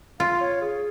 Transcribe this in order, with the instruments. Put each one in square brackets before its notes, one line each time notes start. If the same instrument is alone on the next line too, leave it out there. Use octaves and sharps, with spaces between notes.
[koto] F4 [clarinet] F5
[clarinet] C#5
G#4